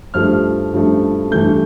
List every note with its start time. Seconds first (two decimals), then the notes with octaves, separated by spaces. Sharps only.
0.14 G2 F3 A3 F6
0.73 G2 F3 A3
1.31 G2 E3 A3 G6